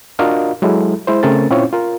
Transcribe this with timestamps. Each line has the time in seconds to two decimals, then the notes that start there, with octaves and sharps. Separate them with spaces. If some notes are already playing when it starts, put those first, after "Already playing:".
0.19 D4 F4 F#4 A#4 D#5 F5
0.62 F#3 G#3 E4 A4
1.07 G#3 E4 C5
1.23 C#3 A3 C4 C#4 A#4 A6
1.50 A#2 C4 C#4 E4 F4 C#5
1.73 F4 A#4